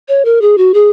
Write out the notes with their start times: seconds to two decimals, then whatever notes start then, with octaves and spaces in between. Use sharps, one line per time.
0.08 C#5
0.25 A#4
0.41 G#4
0.58 F#4
0.74 G#4